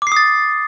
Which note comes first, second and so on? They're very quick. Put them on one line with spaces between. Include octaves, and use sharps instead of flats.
D6 C7 D#6 A6